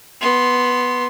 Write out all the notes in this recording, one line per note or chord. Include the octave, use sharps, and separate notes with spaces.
B3 C6